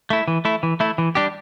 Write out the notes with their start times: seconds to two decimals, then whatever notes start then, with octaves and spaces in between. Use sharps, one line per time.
0.10 A3 E4
0.28 E3
0.45 A3 E4
0.63 E3
0.80 A3 E4
0.98 E3
1.15 G3 D4 G4